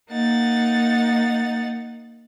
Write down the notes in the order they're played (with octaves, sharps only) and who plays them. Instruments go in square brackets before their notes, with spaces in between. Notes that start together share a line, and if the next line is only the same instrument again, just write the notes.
[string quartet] A#3 D#4 F#5 A6